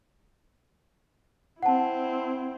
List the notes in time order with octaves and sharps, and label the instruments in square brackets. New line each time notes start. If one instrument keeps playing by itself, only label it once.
[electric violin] C4 E4 [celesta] F#5 A5